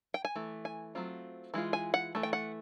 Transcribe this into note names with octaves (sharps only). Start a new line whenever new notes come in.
G5
G#5
E3 A3
G#5
F#3 A3 C4 F4
E3 G#3 F4
G#5
F#5
E3 A3
G5
F#5